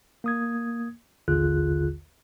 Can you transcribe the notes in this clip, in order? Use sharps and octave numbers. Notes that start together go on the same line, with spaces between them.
A#3 D#6 G#6
A1 D#2 D3 F4 G#4 F#6